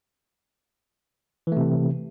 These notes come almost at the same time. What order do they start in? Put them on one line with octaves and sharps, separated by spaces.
E3 A3 C3